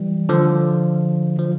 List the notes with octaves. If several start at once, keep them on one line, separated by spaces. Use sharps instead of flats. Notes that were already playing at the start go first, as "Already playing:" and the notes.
Already playing: E3 G3
D3 F3
F3